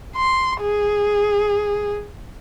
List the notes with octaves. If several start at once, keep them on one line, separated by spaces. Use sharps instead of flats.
C6
G#4